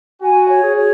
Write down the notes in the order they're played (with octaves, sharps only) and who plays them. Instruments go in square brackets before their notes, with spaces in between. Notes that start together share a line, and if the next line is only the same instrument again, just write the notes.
[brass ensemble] F#4 [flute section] G#5
[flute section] C#5
[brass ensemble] G#4
[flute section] C#5